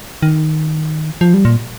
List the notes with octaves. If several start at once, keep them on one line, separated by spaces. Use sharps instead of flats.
D#3
F3
G3
A#2